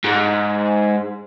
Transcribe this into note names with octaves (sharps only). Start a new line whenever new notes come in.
G#2